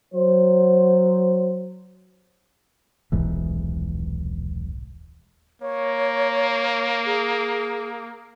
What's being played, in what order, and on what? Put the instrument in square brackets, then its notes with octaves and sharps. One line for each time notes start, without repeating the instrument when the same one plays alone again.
[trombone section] F#3 C5
[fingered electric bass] D#1 B1 G#2 E3
[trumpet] A#3 [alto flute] C#5
[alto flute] G#4